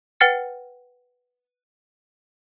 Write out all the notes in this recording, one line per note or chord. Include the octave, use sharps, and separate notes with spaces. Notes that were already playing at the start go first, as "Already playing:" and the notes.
B4 F#5 G5 F6 A6 C#7